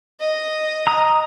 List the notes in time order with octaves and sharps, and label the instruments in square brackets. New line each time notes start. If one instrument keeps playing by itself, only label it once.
[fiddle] D#5
[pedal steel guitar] A#5 D#6